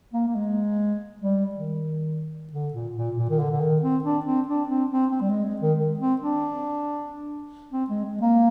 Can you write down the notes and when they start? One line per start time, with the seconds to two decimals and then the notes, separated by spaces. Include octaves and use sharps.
0.14 A#3
0.28 A#3
0.35 G#3
1.22 G3
1.55 D#3
2.53 D3
2.74 A#2
2.96 A#2
3.18 A#2
3.29 D#3
3.39 D3
3.51 D3
3.61 D#3
3.82 C4
4.04 D4
4.26 C4
4.48 D4
4.69 C4
4.91 C4
5.12 C4
5.21 G3
5.29 G#3
5.45 G#3
5.61 D#3
5.78 D#3
5.99 C4
6.21 D4
7.73 C4
7.90 G#3
8.05 G#3
8.21 A#3